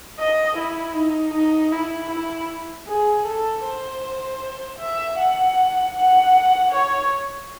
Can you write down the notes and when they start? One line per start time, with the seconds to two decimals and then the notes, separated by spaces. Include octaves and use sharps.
0.19 D#5
0.58 E4
0.95 D#4
1.34 D#4
1.72 E4
2.11 E4
2.88 G#4
3.26 A4
3.65 C5
4.80 E5
5.19 F#5
5.95 F#5
6.71 C#5